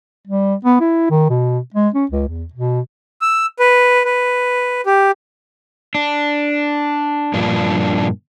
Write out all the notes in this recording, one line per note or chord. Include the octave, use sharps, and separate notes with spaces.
G3
B3
E4
D#3
B2
G#3
C#4
C#2
E2
B2
E6
B4
B4
G4
D4
G2 A#2 F3 D4